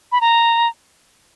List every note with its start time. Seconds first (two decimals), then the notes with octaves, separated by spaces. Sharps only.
0.12 B5
0.21 A#5